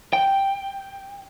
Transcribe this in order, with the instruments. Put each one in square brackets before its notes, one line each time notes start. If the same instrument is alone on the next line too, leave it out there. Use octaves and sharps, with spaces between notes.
[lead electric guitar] G5